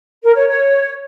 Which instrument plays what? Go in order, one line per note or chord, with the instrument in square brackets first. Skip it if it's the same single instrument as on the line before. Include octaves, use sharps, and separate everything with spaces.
[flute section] A#4
C#5
C#5